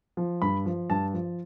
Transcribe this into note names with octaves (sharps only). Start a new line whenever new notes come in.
F3
G2 B5
F3
G2 A5
F3